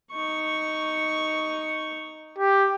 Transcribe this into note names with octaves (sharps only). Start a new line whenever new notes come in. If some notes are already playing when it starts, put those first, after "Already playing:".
D#4 C#6
G4